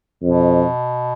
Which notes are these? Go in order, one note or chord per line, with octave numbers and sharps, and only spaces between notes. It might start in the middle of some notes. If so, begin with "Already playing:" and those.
F2 B2